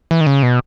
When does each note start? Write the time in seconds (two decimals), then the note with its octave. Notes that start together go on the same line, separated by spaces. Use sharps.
0.11 E3
0.21 D#3
0.27 C#3
0.43 B2